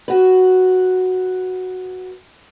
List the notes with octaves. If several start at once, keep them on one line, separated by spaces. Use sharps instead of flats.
F#4 B4